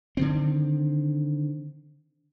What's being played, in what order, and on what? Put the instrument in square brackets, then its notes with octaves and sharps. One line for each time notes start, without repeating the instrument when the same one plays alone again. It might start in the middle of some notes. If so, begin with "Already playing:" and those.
[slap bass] D3 D#3 C4